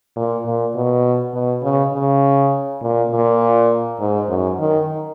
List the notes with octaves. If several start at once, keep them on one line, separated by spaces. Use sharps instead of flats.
A#2
A#2
B2
B2
C#3
C#3
A#2
A#2
G#2
F#2
D#3